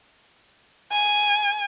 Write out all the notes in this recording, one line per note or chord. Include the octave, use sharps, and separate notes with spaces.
G#5